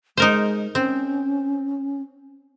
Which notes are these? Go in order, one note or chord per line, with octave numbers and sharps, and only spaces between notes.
G#3 D#4 A#4 C5
C4 C#4